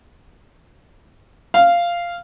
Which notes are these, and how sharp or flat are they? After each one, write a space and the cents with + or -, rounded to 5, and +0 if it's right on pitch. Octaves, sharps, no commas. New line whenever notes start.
F5 -10